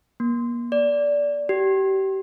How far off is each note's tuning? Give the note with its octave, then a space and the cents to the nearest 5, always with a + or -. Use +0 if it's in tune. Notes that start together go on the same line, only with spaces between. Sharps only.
A#3 +40
D5 -15
G4 -30